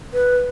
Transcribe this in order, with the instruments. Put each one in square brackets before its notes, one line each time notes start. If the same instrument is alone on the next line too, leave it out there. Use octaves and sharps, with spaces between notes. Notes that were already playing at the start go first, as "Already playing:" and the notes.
[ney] B4